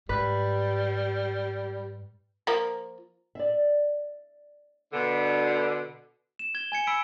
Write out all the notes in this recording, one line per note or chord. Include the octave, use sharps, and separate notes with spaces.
G#2 G3 B4
F3 A#3
D5 E5
B2 D3
E7
G#6 G7
G#5 G#6 C#7
B5 E6 B6 D7